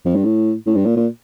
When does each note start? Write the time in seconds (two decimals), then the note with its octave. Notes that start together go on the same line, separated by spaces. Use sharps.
0.05 F2
0.15 G2
0.25 A2
0.66 A2
0.75 G2
0.85 A#2
0.96 A#2